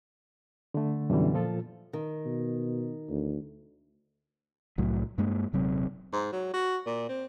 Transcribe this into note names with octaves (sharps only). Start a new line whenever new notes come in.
D3 A3
F#2 B2 D3 E3 G3
A#2 F3 F4 A4
D#3
B2
D2
C2 A2 F#3 A3
G2 G#3 A#3
D#1 C3 F#3 C4
G#2
F#3
F#4
A#2
C4